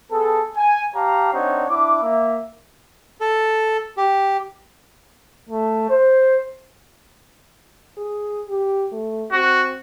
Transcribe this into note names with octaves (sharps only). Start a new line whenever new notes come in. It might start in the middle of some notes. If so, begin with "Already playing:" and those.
B3 G#4 A4
G#5
G4 C#5 F5 A5 A#5
C4 D4 D#4 C#5 F#5
D4 E4 E5 D6
A#3 E5
A4
G4
A3
C5
G#4
G4
A3
C4 F#4